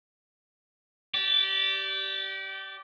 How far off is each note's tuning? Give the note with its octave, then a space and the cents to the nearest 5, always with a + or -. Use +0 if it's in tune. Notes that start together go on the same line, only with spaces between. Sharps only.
G4 -25 D5 +0